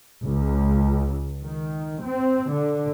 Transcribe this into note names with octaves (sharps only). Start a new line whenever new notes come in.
C#2
D#3
C4
D3